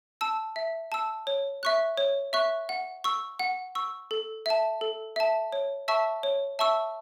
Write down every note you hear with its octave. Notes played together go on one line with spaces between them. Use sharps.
A5 E6
E5
A5 E6
C#5
E5 C#6 F#6
C#5
E5 C#6 F#6
F#5
C#6 E6
F#5
C#6 E6
A4
E5 A5
A4
E5 A5
C#5
E5 A5 C#6 E6
C#5
E5 A5 C#6 E6